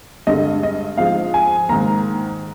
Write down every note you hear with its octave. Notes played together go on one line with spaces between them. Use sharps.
G2 D3 G#3 D#5
D#5
G#2 F3 G#3 F5
G#5
G#2 D#3 A#3 A#5